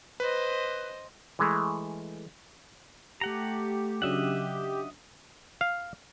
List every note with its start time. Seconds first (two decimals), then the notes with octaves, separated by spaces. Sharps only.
0.20 B4 C5 D#5
1.39 E3 G#3 A3
3.21 A3 G4 F#5 A#5
4.02 C#3 F#3 D4 D#5 E5 F#5
5.61 F5